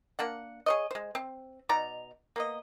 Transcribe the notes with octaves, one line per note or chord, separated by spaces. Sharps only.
A#3 D4 F#5
G#4 C#5 D#5
G#3 C5
C4
B2 D#4 D5 A#5
A#3 B3 D#5